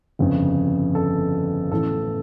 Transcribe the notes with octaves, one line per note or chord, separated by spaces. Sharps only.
G1 F2 C#3
A4
A1 A2 E3 A4